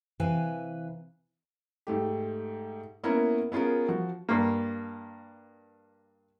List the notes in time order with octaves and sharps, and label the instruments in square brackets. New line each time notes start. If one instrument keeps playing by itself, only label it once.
[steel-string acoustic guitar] C3 E3 B4 F5 G#5
[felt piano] G#2 A3 G4
A#3 B3 C#4 E4 A#4
B3 C#4 F4 G#4 A#4
F3 F#4
[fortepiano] G2 A#3